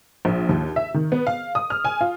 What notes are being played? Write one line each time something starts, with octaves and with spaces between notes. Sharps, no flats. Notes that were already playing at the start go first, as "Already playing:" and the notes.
A#1
D#2
E5
D#3
B3
F5
D#6
F6
G#5
F4